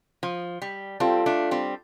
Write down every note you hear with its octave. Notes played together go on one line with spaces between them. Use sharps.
F3
G3
G3 C4 F4 A4 F5 A5
A3 D4
G3 C4